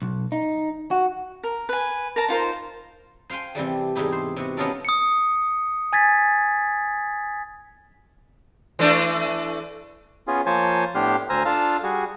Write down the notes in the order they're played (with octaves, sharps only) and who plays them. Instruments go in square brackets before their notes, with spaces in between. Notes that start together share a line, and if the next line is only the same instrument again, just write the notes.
[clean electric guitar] B1
D#4
F#4
[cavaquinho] A#4
B4 G#5
A#4 A5 A#5
D#4 F4 A#4 C5
[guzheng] C5 F5 G5 G#5 C6
C3 E3 G3 A3
E2 G#2 D#4 E4 G4
C5
C3 B3 F#4
B3 C#4 D#4 F4 A4 A#4
[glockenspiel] D#6 C#7
G#5 G#6 A6 B6
[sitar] E3 A3 D4
[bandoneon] B3 C#4 F4 G#4
F3 A#3 C5 C#5 G#5 A5
A2 B3 D4 G4 C6 F6
D2 C5 G#5 A#5 E6 F6
D4 F4 A4 F5 A5 E6
G3 F#4 G#4